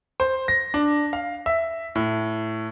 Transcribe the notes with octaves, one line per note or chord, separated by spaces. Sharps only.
C5
A#6
D4
F5
E5
A2